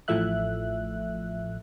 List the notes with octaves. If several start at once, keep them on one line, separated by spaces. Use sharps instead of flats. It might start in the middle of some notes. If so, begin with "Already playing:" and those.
A1 A2 F3 A3 E5 F#6